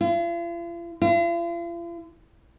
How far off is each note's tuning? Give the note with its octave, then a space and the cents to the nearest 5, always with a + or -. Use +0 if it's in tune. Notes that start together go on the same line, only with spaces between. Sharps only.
F4 -45
F4 -45